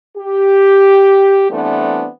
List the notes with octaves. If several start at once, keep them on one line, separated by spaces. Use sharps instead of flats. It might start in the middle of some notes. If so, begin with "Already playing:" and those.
G4
E3 G3 A3 B3 C4 D4